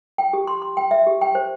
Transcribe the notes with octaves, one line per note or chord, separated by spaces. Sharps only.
G5
G4
C6
C6
G5
E5
G4
G5
C5